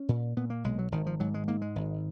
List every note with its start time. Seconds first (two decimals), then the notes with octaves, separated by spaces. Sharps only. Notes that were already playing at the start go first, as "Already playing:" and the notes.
Already playing: C#4
0.09 A#2
0.37 A#2 B3
0.50 A#3
0.64 B1 G#3
0.78 F#3
0.92 G#1 D#3
1.06 F3
1.20 G#2 F#3
1.34 G#3
1.48 G#2 A#3
1.62 G#3
1.76 G#1